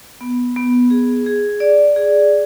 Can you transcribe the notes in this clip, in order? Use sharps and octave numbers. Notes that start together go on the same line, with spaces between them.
B3
B3
G#4
G#4
D5
G#4